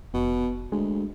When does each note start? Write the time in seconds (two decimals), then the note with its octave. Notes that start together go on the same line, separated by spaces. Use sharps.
0.14 F1 B2
0.72 D2 G#3